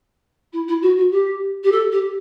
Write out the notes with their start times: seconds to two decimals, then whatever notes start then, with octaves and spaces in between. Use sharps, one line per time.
0.52 E4
0.68 E4
0.82 F#4
0.97 F#4
1.11 G4
1.63 G4
1.71 A4
1.91 G4